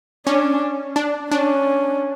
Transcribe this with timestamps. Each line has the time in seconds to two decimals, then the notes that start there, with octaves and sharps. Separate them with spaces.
0.27 C#4 D4
0.96 D4
1.31 C#4 D4